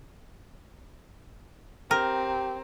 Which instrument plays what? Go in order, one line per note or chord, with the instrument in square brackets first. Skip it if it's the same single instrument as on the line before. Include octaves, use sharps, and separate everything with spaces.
[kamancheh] C4 [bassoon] G4 [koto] A#4